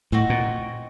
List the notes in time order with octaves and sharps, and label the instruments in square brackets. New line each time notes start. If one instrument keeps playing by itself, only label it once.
[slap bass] A2 [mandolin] C4 D#4 F#4
[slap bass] A#2